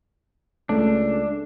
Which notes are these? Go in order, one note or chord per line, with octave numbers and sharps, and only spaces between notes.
C#2 A3 D4